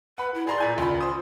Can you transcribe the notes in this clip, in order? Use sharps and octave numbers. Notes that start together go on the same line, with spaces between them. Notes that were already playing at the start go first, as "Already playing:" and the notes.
B4 F#5 B5
E4
G#4 D5 A#5 C6
A#2 G#5 G6
C#2 F4 B5
C5 D#6